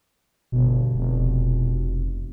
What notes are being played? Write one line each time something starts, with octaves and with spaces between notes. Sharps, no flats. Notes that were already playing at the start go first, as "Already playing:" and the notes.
G1 B2
F1